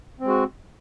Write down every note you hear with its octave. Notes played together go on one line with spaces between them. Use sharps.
G#3 C4 F#4